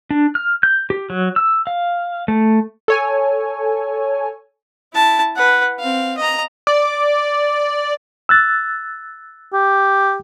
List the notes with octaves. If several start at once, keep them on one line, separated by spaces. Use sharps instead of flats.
D4
F6
G6
G4
F#3
E6
F5
A3
A4 C#5 G#5
E4 A5
B4 F#5
C4 F5
D#5 A#5
D5
E6 F#6 A6
G4